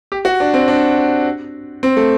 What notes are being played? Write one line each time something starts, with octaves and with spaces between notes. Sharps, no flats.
G4
F#4
D4
C4
D4
C4
A3